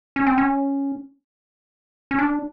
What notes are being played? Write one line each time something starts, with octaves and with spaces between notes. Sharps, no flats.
C#4
C4
C#4
C#4
D4